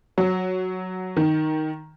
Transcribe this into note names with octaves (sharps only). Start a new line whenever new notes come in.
F#3
D#3